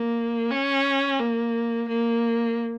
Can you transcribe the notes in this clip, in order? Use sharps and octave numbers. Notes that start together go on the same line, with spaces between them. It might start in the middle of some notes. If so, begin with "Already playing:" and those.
Already playing: A#3
C#4
A#3
A#3